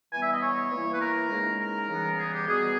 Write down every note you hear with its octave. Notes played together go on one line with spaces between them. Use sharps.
E3 G3 B3 G#5
E5
D#5
C#5
E3 A#3 E4
B4
A#4
C#3 G#3 D#4
A#4
C#3 E3 G3 B3
G#4
G4
B2 G3 B3 G#4